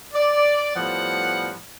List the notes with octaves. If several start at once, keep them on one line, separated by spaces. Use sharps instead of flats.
D5
A2 F3 G3 B3 F#5